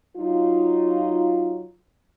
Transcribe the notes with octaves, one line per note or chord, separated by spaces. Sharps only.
F#3 D#4 F4